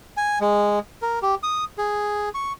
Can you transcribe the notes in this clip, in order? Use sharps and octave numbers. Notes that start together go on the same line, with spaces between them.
G#5
G#3
A#4
G4
D#6
G#4
C#6